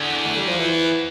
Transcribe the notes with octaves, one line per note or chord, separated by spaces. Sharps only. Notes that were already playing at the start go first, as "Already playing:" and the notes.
Already playing: E2 D3
A3
G3
F3
E3